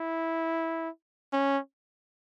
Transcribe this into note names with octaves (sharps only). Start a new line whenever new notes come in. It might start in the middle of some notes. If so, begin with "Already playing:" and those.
Already playing: E4
C#4